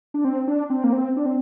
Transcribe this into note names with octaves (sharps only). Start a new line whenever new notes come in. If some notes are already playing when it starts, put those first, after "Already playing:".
D4
C4
D4
C4
A#3
C4
D4
C4